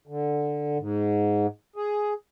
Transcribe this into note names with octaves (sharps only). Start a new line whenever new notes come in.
D3
G#2
G#4